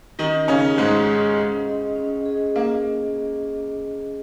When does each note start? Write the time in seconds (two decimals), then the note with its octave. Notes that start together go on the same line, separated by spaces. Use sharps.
0.19 D#3 C#4 D#4
0.48 C#3 C#4 G#4 D#5
0.77 G#2 G#3 C#4
1.07 G#4 D#5
1.37 C#4
1.66 G#4 D#5
1.96 C#4
2.26 G#4 D#5
2.56 A#3